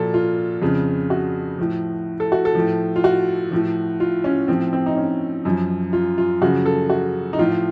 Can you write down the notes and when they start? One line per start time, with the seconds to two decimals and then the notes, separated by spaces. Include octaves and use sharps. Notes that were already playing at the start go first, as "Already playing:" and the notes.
Already playing: A#2 F3 F#4 A4
0.14 F4
0.62 F2 C#3 F3
1.10 F#4
1.58 A2 F3
2.20 A4
2.32 F#4
2.45 A4
2.55 A2 F3
2.96 F4
3.04 F#4
3.51 A2 F3
4.00 F4
4.24 C#4
4.48 A2 F3 C4
4.73 C4
4.86 D#4
4.97 C#4
5.45 F#2 F3
5.93 F4
6.18 F4
6.41 F#2 C#3 F3 F#4
6.66 A4
6.90 F#4
7.33 D#4
7.39 A2 F3 F4